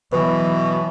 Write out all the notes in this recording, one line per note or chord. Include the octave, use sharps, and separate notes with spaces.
B2 E3 F#3 B4